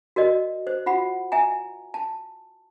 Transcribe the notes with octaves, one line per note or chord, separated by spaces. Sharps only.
F#4 A#4 D5 D#5
C5
F4 F#4 F#5 B5
E5 G#5 A#5
A5